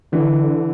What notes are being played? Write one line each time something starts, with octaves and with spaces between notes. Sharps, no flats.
D3 E3